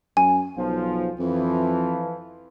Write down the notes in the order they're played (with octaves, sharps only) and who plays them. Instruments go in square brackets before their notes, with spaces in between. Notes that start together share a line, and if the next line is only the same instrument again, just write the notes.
[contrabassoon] F#2 [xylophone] G#5
[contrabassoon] B1 [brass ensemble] F3
[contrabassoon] F2 [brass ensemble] E3 F3